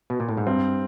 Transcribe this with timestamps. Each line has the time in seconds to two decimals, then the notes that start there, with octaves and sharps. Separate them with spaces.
0.10 B2
0.20 A#2
0.29 A2
0.37 G#2
0.47 G2 C4